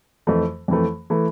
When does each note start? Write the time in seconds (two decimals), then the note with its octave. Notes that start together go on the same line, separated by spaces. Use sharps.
0.27 F2 E3 A3
0.68 F2 E3 A3
1.10 E3 A3